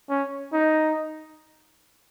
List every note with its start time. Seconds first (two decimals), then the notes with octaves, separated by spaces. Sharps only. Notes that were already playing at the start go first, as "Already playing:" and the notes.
0.10 C#4
0.53 D#4